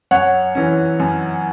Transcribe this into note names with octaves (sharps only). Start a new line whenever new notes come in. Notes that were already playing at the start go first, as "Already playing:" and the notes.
F#2 C#5 F#5
E3 C#4
F#2